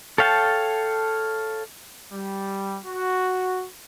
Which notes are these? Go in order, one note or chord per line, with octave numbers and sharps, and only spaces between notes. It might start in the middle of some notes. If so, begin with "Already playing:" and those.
A4 C#5 F5 G5 A5
G3
F#4